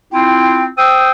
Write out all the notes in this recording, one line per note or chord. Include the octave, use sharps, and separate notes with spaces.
C4 E4 F4 G5
C5 G5 D#6 E6